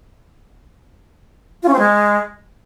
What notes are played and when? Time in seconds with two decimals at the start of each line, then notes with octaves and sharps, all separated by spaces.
1.63 F4
1.68 C#4
1.73 C4
1.79 G#3